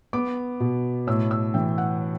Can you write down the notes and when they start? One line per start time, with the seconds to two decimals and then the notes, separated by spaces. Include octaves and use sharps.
0.13 B3 D6
0.60 B2
1.07 A2 E6
1.31 E6
1.54 E3 G5
1.78 F#5